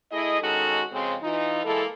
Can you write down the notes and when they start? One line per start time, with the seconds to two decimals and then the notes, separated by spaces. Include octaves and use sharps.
0.11 A3 E4 G#4 D#5
0.42 D#3 G#3 C#4 D#4 F#4 A4
0.92 F2 C#3 G#3 C4
1.22 E3 D#4 F4
1.64 E3 G#3 A#3 E4 A4